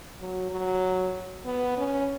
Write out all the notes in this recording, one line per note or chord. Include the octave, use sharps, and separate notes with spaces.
F#3
F#3
B3
C#4